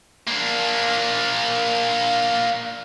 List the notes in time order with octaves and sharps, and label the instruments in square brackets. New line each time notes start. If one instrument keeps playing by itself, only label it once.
[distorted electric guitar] A#3 D4